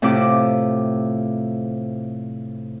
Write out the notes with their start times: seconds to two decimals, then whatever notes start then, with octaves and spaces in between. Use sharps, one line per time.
0.02 A2 C3 E4 F4 D6